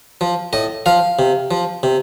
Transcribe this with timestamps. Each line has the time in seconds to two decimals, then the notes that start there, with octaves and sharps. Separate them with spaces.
0.21 F3
0.53 A2 D#5
0.86 F3 F5
1.19 C3
1.51 F3
1.83 C3